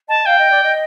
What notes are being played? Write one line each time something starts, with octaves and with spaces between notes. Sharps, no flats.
D#5 A5
F5 G5
D#5
D5
D#5